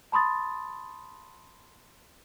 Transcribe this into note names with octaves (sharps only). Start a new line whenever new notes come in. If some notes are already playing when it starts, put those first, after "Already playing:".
A5 B5 C6 D#6 A6